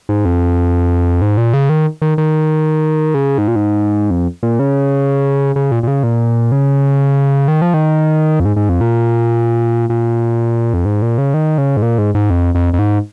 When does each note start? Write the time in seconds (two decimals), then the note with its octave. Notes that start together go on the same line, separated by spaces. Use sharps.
0.09 G#2
0.25 F2
1.22 G#2
1.37 A#2
1.54 C#3
1.69 D#3
2.02 D#3
2.18 D#3
3.14 C#3
3.38 G#2
3.48 A#2
3.56 G#2
4.11 F2
4.43 A#2
4.59 C#3
5.56 C#3
5.72 A#2
5.83 A#2
5.87 C#3
6.03 A#2
6.52 C#3
7.48 D#3
7.62 F3
7.74 D#3
8.40 F2
8.45 G#2
8.56 G#2
8.69 F2
8.81 A#2
9.90 A#2
10.74 F2
10.85 G#2
11.02 A#2
11.18 C#3
11.34 D#3
11.58 C#3
11.77 G#2
11.82 A#2
11.98 G#2
12.15 G#2
12.30 F2
12.55 F2
12.74 F2
12.79 G#2